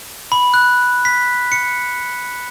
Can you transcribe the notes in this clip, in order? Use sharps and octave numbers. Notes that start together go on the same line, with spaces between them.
B5
F#6
B6
C#7